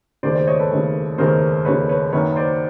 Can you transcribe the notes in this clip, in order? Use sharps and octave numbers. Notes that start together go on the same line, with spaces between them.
F1 D#2 C#3 C5 D5
C5 D5
C#5 D#5
A4 B4
F1 D#2 C#3
F1 D#2 C#3 A#4 C5
F1 D#2 C#3 B4 C#5
B4 C#5
F#1 F#2 D#3 F#3 B4 C#5
C5 D5